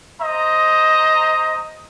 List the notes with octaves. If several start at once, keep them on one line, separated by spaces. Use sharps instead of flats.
C5 D#5 A#5